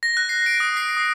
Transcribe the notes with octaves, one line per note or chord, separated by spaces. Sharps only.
A#6
F#6
C7
D7
D#6
C7
D#6